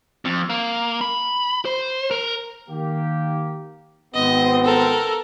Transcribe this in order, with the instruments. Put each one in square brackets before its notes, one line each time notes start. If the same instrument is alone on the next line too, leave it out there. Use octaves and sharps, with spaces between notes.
[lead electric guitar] F2
A#3
B5
C5
A#4
[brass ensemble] D#3 A#3 G4
[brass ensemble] G#1 B3 C4 [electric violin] D#5
[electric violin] A4 A#4